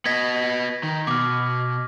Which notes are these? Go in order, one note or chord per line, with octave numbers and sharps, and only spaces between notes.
B3 D#5 G#6 A#6 B6
D#3
B2 D6 F6